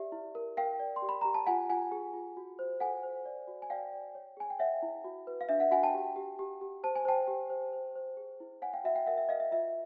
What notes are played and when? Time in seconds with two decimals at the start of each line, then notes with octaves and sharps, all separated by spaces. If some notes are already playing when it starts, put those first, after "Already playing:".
Already playing: G4 D5 E5
0.12 E4
0.35 A#4
0.57 A#4 F5 G5
0.80 D5
0.96 C6
1.02 G4
1.09 B5
1.21 G4 A#5
1.34 A5
1.46 F4 F#5 G#5
1.70 F4 F#5 G#5
1.92 G#4
2.13 F4
2.37 F#4
2.59 C5
2.80 A4 F#5 G#5
3.03 C5
3.25 D5
3.47 F#4
3.62 G#5
3.70 D5 F5 G5
3.93 D5
4.15 C#5
4.37 G#4 G#5
4.50 G5
4.59 C#5 E5 F#5
4.82 E4
5.04 F#4
5.27 B4
5.41 F5
5.49 D4 E5
5.60 E5 F#5
5.71 F#4 F#5 G#5
5.83 G5 A5
5.94 G4
6.16 G4
6.39 G4
6.61 G4
6.83 C5 A5
6.95 G#5
7.05 C5 G5 A5
7.27 G4
7.50 C5
7.73 C5
7.96 C5
8.17 G#4
8.40 E4
8.62 C#5 F#5 G#5
8.73 F5 G5
8.84 F#4 E5 F#5
8.95 F5 G5
9.06 A#4 E5 F#5
9.18 E5
9.29 A#4 D#5 F5
9.40 E5
9.51 F4 E5